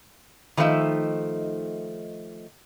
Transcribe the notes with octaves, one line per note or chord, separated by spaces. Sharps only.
D#3 F3 A3 D#4 E5